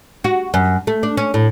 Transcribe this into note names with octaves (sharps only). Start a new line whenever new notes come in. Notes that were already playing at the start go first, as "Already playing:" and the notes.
F#4
F#2
A3
D4
C#4
A2